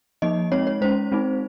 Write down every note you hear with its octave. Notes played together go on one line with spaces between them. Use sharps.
F3 A#3 D#4 D#5
G#3 C4 D#4 C#5
C#5
G#3 C#4 C5
G#3 C4 D#4